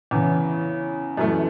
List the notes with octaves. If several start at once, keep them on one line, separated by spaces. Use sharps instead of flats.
E2 C#3 E3
F#2 E3 A3